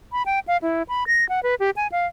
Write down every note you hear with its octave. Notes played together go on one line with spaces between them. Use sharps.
B5
G5
F5
E4
B5
A#6
F#5
B4
G4
G#5
F5